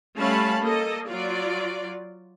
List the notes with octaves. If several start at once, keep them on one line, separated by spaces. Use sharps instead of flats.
G3 A3 C#4 F5 A5 B5
A#3 A4 D#5
F#3 F4 D5